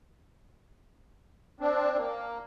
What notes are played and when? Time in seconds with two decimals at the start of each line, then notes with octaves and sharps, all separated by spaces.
1.60 C4 D4
1.97 A#3